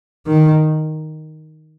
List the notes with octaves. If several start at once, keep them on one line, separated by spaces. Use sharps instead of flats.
D#3